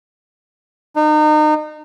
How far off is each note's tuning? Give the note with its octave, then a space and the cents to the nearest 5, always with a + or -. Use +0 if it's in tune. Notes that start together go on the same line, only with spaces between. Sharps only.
D#4 -35